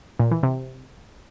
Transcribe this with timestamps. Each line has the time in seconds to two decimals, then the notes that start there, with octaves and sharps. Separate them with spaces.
0.19 A#2
0.31 E3
0.43 C3